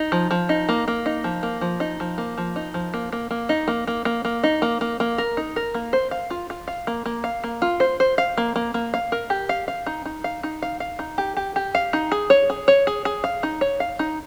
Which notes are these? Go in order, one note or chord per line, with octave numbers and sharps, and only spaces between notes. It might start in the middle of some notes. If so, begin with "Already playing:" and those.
Already playing: D#4
F3
F3
D#4
A#3
A#3
D#4
F3
A#3
F3
D#4
F3
A#3
F3
D#4
F3
A#3
A#3
A#3
D#4
A#3
A#3
A#3
A#3
D#4
A#3
A#3
A#3
A#4
D#4
A#4
A#3
C5
F5
F4
F4
F5
A#3
A#3
F5
A#3
F4
C5
C5
F5
A#3
A#3
A#3
F5
A#4
G4
F5
F5
D#4
D#4
F5
D#4
F5
F5
D#4
G4
G4
G4
F5
D#4
G#4
C#5
G#4
C#5
G#4
G#4
F5
D#4
C#5
F5
D#4